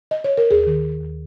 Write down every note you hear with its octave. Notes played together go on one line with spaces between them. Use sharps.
D#5
C#5
A#4
D#2 G#4
D#3
D#3
D#2